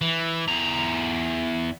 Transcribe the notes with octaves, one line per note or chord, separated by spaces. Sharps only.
E3
E2 A#5